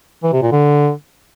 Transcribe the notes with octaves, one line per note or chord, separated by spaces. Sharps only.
E3
C3
A#2
D3